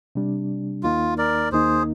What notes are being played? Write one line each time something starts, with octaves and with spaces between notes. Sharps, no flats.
C3 G3 D4
D#2 D#3 A#3 D#4 F4
A#4 D5
D#2 D#3 A#3 D#4 G#4 C5